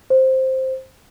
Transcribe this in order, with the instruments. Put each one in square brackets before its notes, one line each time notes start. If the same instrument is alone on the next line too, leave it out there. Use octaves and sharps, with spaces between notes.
[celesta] C5